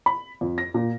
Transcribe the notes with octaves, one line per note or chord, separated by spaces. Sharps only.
B5
F2
A#6
A#2